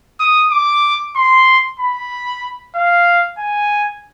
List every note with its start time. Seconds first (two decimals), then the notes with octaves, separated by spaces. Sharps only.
0.20 D#6
0.51 D6
1.16 C6
1.80 B5
2.75 F5
3.38 G#5